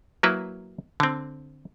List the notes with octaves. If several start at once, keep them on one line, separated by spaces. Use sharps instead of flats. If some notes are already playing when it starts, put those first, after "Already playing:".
F#3 A#3 E4 B4
D3 C4